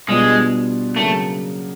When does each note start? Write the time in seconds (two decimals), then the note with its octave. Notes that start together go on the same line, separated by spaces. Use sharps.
0.08 B2 G3 G#3 B3 D4 F4
0.96 C#3 F#3 A3 A#3